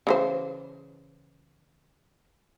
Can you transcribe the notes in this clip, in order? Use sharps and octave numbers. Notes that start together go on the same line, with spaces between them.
C#3 E3 C5